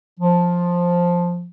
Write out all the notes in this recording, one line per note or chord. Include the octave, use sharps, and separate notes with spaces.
F3